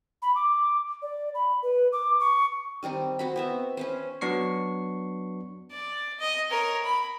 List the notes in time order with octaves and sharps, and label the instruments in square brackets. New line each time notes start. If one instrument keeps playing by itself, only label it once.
[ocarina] B5
D6
D5
B5
B4
D6
C#6
[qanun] D#3 G3 C4 D#4
C4 F#4 B5
B3 C4 E5
C#4 B4 C5
[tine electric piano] F#3 B3 D4 C#6 C7
[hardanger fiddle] D5
D#5
A#4 C#5
B5